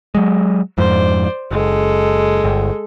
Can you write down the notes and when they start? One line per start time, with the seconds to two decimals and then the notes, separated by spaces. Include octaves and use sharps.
0.15 F#3 G#3
0.78 F2 G#2 C5 D5
1.51 F#1 G#3 A4
2.44 G1